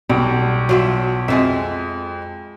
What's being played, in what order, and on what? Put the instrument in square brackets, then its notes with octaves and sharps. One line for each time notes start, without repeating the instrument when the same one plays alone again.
[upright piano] B1 [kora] G3
[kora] F#3 F4 E5
[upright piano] F2 [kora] G#3 F4 E5